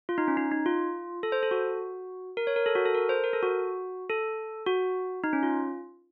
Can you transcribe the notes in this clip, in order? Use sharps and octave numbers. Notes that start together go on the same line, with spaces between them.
F4
D#4
C#4
D#4
D#4
F4
A4
C5
A4
F#4
A#4
C#5
A#4
A4
F#4
A4
A#4
C5
A#4
A4
F#4
A4
F#4
D#4
C#4
F4